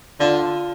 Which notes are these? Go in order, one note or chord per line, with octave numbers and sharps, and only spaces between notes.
D3 F4